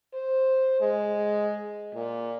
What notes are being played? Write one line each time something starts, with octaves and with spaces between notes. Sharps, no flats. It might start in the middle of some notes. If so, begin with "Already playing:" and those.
C5
G#3
A#2